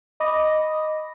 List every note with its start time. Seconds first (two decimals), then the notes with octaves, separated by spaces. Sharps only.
0.20 D#5 B5 D6 D#6 A#6